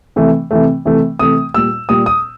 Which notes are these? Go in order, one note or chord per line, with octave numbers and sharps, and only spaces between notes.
C3 E3 A3
C3 E3 A3
C3 E3 A3
C3 E3 A3 D#6
A#2 G3 E6
A#2 G3 D#6
D#6